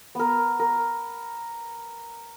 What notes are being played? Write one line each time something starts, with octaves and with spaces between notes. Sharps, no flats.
B3 A#4
A#4